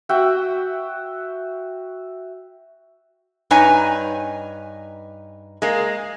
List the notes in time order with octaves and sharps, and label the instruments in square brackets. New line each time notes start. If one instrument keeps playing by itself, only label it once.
[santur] F#4 E5 F#5 G5
[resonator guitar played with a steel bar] G2 D#4 B4 C#5 G#5 A#5
G#3 A#3